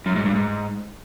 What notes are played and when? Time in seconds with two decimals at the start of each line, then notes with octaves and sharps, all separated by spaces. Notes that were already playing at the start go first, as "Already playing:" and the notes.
0.06 F#2
0.16 G#2
0.25 G2
0.35 G#2